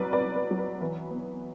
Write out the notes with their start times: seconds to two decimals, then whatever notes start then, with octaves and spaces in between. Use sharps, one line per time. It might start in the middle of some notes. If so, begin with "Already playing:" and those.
Already playing: C2 F#3 B4 D5
0.13 B4 D5
0.20 C2
0.36 B4
0.51 F#3
0.59 B4
0.81 E3 B4
1.11 B3